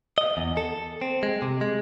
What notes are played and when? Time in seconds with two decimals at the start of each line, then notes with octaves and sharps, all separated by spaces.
0.18 D#5
0.37 E2
0.57 A4
1.02 C4
1.23 G#3
1.42 C3
1.61 G#3